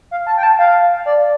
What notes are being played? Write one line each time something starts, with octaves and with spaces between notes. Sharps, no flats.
F5
A5
G5
A5
F5
D5